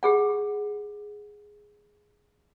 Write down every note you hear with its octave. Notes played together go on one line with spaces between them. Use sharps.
G4 G#4 F#5